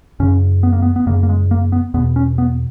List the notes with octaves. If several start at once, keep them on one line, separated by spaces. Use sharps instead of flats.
F#2 C#3 C#4
B3
A#3
B3
B3
F#2 C#3 A#3
A#3
G#3
A#3
B3
E2 B2 B3
C#4
B3